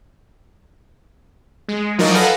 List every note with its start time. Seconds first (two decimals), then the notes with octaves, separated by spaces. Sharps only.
1.68 G#3
1.99 F3 F#3 D#4 A#4 D5 D#5
2.14 A4 B4 F5 F#5 G#5 A#5